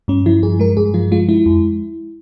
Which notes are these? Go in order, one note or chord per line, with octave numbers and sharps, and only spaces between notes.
G2 C#4
F3 E4
G2 G#4
G#3 A#4
G2 G#4
F3 F4
G#3 F4
G#3 E4
F2